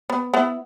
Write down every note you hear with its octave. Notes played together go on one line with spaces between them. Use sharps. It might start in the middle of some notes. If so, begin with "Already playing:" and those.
B3
B3 E4